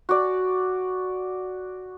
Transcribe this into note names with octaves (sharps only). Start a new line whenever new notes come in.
F#4 D5